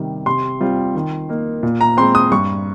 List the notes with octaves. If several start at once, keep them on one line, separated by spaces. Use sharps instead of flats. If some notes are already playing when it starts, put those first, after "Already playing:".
Already playing: C3 D#3 G3
C3 C6
G3 C4 F4
D#3
A#3 D#4
A#2
A#5
G#3 C4 C6
D#6
G2 C#6